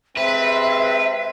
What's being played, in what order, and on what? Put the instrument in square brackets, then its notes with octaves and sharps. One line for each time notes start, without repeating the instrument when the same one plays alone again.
[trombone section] C3 G#3 C4 [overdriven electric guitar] B4 [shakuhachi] E5